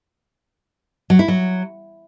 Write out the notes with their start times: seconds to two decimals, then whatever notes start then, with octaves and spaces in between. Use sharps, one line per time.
1.10 F#3
1.19 E4
1.28 F#3